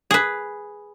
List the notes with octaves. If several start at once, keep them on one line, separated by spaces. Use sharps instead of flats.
G#4 B4